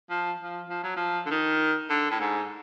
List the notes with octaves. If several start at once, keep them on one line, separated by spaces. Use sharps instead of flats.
F3
F3
F3
F#3
F3
D3
D#3
D3
A2
G#2